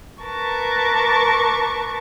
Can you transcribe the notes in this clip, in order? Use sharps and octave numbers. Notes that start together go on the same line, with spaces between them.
A#4 B4 A5 C#6 D6